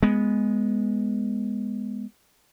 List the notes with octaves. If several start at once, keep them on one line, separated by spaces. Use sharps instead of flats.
G#3 B3